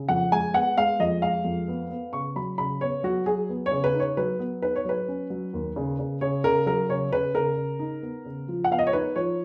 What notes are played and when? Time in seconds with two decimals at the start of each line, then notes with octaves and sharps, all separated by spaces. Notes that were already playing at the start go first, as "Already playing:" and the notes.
Already playing: C#3
0.08 F2 F#5
0.32 G#3 G#5
0.54 B3 F#5
0.77 G#3 F5
1.00 F2 D#5
1.22 G#3 F5
1.45 F2
1.68 B3
1.90 B3
2.13 C#3 C#6
2.36 F#3 B5
2.58 C#3 B5
2.81 B3 C#5
3.03 F#3 F#4
3.26 F#3 G#4
3.49 B3
3.66 C#5
3.71 C#3
3.84 B4
3.94 D#4
4.00 C#5
4.17 F#3 B4
4.39 B3
4.62 D#4 B4
4.76 C#5
4.85 F#3 B4
5.08 C#4
5.30 F#3
5.53 D#2
5.76 C#3
5.99 C#3
6.21 C#3 C#5
6.44 C#3 A#4
6.66 F#3 A#4
6.89 C#3 C#5
7.11 C#3 B4
7.34 C#3 A#4
7.57 C#3
7.79 D#4
8.02 B3
8.25 C#3
8.48 F3
8.64 F#5
8.71 B3 F5
8.79 D#5
8.87 C#5
8.93 D#4 B4
9.16 F3 C#5